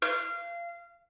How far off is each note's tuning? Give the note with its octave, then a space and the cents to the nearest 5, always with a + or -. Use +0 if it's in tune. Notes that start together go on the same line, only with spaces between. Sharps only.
F5 -25